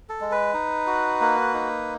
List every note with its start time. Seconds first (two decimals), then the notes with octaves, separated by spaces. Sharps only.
0.09 A4
0.21 G#3
0.32 B4
0.54 D#4
0.87 F#4
1.21 A#3
1.54 D#4